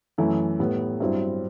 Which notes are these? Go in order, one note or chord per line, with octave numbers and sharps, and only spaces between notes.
F#2 E3 A3 E4
A2 G3 B3
G2 F#3 C4 E4